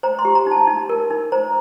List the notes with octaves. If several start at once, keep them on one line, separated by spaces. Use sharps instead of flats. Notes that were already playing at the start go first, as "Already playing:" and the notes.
C5 A#5
C6
G4
A#5
D#4 A5
D#4
A#4
D#4
C5 A#5